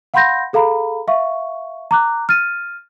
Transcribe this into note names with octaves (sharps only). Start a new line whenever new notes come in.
F5 F#5 B5 C6 G6 A#6
G#4 A4 F5 A#5 B5
E5 F5 C#6
A#5 D6 F#6
F6 A6 D#7